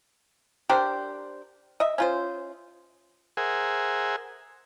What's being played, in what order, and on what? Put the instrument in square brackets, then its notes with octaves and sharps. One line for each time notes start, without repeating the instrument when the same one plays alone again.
[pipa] D4 G4 A#4 C5
D#5 E5
C#4 F4 C5
[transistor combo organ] G#4 A#4 C5 E5 F#5 G#5